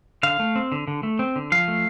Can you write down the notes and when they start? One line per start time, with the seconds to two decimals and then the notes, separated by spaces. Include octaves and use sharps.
0.23 D3 F5
0.40 A3
0.56 C4
0.72 D3
0.88 D3
1.03 A3
1.19 C4
1.36 D3
1.52 F3 F5
1.68 A3